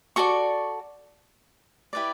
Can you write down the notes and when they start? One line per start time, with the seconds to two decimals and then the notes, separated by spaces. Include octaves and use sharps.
0.16 F#4 A4 D5 C#6
1.93 E4 G4 B4 D5